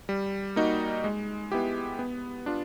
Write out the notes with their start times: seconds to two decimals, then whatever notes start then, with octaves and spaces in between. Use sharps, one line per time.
0.09 G3
0.56 A#3 D#4 F#4
1.04 G#3
1.52 B3 E4 G4
1.99 B3
2.46 D4 F4